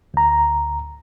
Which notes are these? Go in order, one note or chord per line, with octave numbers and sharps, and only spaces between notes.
D2 A#5